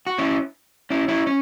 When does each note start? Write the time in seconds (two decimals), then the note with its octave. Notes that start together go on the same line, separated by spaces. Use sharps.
0.07 F#4
0.18 C#4 E4
0.90 C#4 E4
1.08 C#4 E4
1.27 C#4